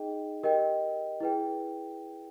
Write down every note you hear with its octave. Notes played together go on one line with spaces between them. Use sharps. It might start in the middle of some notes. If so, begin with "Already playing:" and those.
Already playing: D#4 G#4 D#5 G5
G4 A#4 D#5 G5
E4 G#4 B4 G5